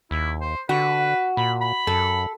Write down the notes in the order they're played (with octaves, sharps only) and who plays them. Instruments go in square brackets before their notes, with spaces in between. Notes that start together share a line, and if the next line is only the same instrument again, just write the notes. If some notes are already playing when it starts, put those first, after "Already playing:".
[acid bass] D#2 [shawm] E4
[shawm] C5
[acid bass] D3 [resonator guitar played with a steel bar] F#4 [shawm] B4
[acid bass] A#2 [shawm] B5
[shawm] B5
[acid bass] F#2 [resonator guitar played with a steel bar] A4